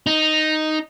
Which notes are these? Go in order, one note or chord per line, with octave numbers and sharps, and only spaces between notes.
D#4